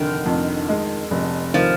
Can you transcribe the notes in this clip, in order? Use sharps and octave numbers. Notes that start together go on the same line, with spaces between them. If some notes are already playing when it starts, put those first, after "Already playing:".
Already playing: F1 D3 D#3
F2
G#3
F1
D#3 F3